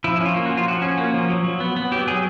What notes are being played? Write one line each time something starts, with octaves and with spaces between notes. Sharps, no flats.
F3 E4
E4
C#4 F4
A#3
F#4
F3
F4
F3 F#4
C#4
A#3
F3
F#3
F#3
B3
B3
F#3 G4
F#3 G#4